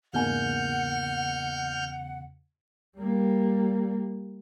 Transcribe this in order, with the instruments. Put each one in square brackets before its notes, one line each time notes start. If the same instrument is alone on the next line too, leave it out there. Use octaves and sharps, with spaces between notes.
[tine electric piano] E2 C#3 [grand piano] G#2 A#3 G#5 [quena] F#5 [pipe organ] F6 G6
[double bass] G3 A#3